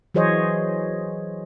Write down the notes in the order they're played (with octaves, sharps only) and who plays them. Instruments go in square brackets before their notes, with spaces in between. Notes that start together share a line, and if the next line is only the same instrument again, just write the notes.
[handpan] E3 F#3 G#4 C5 C#5 D#5